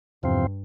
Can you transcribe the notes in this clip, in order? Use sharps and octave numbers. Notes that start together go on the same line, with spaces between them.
E2 G2 C3 F3 C4